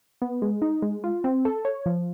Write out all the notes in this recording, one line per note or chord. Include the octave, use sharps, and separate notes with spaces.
B3
G#3
D#4
G#3
F4
C4
A4
C#5
F3